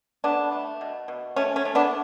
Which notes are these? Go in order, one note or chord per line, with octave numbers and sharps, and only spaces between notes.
A3 B3 D4
A3
B2
B2
A3 C#4
C#4
A3
B3 D4